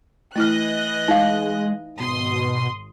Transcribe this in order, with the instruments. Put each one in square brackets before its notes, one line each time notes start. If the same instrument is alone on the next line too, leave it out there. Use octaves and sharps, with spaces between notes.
[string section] E3 D#5 F#6 [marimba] A3 E4 F6
[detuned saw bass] G#3 [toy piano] D#4 F5
[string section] G#1 C6 D#6 [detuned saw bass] B2